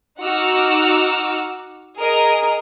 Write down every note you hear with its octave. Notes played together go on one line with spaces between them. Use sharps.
D#4 F#4 F#5 D6 E6 F6
G#4 A#4 D#5